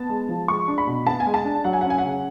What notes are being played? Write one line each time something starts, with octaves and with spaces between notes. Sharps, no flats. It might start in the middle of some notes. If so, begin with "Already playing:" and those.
Already playing: B3 A5
G#3
F3
G#3 C#6
D4
B5
B2
B3 A5
G#5
G#3
A5
D4
F#3 F#5
G#5
F#5
C#4
G#5
F#5
C#3